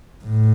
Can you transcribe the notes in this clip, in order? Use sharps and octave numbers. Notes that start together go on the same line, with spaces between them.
A2